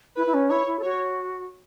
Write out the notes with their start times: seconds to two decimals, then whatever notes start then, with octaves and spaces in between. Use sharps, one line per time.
0.16 E4 B4
0.26 E4
0.34 C#4
0.50 E4 C#5
0.67 E4
0.79 A4
0.83 F#4 C#5